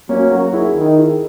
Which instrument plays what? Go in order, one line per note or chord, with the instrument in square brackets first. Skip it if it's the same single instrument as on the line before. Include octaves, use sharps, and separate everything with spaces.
[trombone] F#3 [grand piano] A#3 C#4
[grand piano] F#4 A#4
E4 G#4
[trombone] D#3
[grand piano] E4 G#4